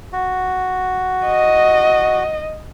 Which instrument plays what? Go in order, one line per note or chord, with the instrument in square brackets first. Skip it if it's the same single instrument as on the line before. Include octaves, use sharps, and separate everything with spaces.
[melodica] F#4
[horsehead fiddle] D#5